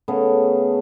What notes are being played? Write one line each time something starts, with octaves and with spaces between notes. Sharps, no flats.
C#3 A3 B3